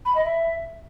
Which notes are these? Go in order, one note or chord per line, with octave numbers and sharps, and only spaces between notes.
B5
D#5
E5